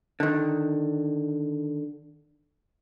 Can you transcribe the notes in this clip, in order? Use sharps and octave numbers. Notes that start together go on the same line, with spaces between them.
D3 D#3